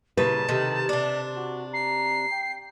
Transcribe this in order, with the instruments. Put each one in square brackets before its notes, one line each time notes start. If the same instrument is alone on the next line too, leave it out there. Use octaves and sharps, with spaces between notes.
[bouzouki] A#2 C#3 G3 [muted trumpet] E4 [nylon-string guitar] B4 [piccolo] A5
[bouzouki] C3 D#3 [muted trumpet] A4
[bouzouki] C3 D4 [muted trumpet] D5
[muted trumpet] F#4
[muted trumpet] A#5 [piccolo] C7
[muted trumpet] G5